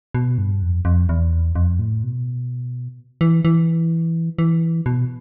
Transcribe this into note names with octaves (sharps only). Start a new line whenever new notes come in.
B2
G2
F2
F2
E2
F2
A2
B2
E3
E3
E3
B2